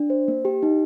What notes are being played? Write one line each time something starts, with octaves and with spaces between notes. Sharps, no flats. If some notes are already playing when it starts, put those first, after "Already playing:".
Already playing: D4
C5
A#3
G4
D#4